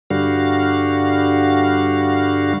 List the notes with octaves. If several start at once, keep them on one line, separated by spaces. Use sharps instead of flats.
G2 D3 G3 F#4 F5